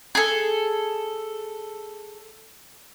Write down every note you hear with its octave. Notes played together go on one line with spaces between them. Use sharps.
G#4 A4